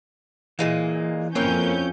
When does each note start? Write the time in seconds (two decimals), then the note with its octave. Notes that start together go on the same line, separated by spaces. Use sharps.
0.59 A#2 E3 G#3 A#3
1.35 F2 E3 A#3 C4 C#4 C#5 G6